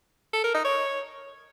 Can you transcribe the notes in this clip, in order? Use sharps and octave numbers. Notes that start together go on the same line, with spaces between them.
A4
A#4
D#4
C#5